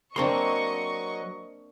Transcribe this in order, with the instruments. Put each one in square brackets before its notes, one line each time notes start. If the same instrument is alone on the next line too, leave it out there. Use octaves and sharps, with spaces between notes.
[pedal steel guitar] F#3 A#4 C6 [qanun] A#3 C4 D4 [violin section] D#5 C#6